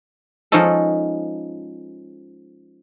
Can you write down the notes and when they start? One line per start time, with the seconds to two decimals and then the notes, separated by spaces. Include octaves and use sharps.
0.52 F3 G#3 C#4 D#4 A4